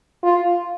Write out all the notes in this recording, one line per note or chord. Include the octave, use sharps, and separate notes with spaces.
F4